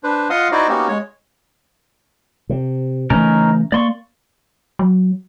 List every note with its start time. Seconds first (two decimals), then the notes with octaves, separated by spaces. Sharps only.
0.03 D4 B4 C5
0.30 F4 D#5 F5 F#5 C6 D#6
0.52 D#4 E4 F#4 C5 D5 D#5
0.69 A#3 B3 C#4 D#4 F#4 G4
0.88 G#3 C#5
2.49 C3
3.10 C#3 E3 A3 C#4 D#4 A#4
3.72 A#3 D5 C6 C#6
4.79 F#3